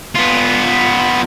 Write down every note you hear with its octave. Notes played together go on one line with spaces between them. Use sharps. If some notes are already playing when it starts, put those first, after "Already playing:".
B3 F4